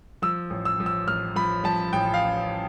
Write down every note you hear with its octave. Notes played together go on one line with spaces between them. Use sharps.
F3 E6
A1
E6
F3
E6
A1 F6
F3 B5
F3 A5
A1 G5
F5